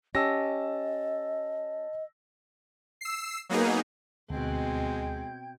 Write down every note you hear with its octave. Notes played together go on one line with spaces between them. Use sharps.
C#4 G4 D#5 A5 E6 A#6
E6 C7
F#3 A#3 B3 D#4 G#4
D2 B2 G#3 C4 G5 G6 G#6